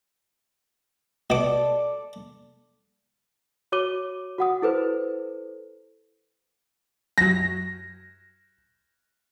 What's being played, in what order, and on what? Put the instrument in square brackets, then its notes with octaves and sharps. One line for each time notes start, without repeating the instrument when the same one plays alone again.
[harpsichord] B2 D6 [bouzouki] A4 D5
[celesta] F#4 C#5 D6 D#7 G7
F#4 F#5 D#6
E4 A4 B4 C5
[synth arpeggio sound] F#2 F#3 [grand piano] A#6